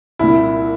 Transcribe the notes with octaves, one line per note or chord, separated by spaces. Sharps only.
C2 A#2 E4